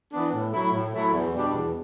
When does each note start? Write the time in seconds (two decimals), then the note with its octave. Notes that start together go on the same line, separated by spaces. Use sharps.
0.12 E3 B3 D4
0.32 A2
0.52 F#3 A3 E4
0.72 A2
0.93 F#3 A3 E4
1.13 E2
1.34 B2 G3 D4
1.54 E2